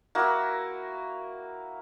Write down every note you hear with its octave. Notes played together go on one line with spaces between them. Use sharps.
A#3 E4 F#4